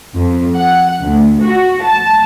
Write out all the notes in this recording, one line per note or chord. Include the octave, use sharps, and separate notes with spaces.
F2
F#5
D2
F#4
A5